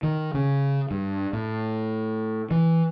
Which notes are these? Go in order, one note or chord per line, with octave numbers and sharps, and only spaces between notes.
D#3
C#3
G2
A2
E3